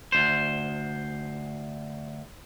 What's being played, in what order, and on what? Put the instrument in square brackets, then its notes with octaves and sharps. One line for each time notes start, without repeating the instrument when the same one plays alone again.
[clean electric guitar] D2 C5